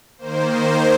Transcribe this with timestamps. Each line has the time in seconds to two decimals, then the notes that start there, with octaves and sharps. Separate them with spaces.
0.18 D#3 A#3 C5
0.47 C5